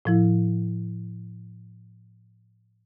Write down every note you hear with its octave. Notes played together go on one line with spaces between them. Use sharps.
A2 F3 E4